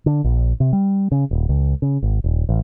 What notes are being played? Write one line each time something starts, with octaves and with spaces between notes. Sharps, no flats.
D3
A#1
C3
G3
C#3
D#1
C#2
C#3
G#1
D#1
A1